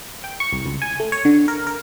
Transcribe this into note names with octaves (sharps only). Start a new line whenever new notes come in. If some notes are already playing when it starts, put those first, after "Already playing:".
G5
C#6
C2
C#2
G#5
A3
C#5
D3
A#4
A#4